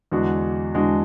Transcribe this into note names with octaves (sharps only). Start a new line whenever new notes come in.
E2 D3 G#3 D4 F#4
E2 D3 G#3 D4 F#4